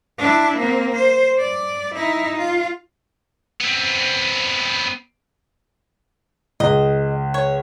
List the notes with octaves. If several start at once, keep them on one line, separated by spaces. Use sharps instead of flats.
D4 E4
A#3 C4
C5
D5
D#4 E4
F4
B3 C4
C#2 D#5
C#5